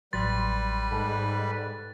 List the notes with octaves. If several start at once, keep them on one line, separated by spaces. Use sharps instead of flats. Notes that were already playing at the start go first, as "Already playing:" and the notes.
A1 F#3 G3 B4 C6 A6
G#2 A4 F#6